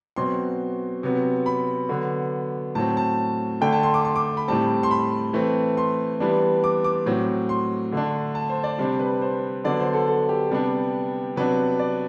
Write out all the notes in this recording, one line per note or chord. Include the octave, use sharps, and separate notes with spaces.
B2 F#3 C4 C6
C3 F#3 B3
B5
D3 F#3 B3
A2 F#3 C4 A5
A5
D3 A3 D4 G5
A5
C6
D6
C6
D6
B5
A2 G3 C4 A5
C6
B5
E3 A3 C4
C6
E3 G3 B3 D4
D6
D6
A2 F#3 C4
C6
D3 A3 D4
A5
C5
D5
C3 G3 D4 C5
B4
C5
D3 F#3 B3 D4 D5
C5
A4
A4
G4
C3 G3 B3 D4
C3 F#3 B3 D4 B4
D5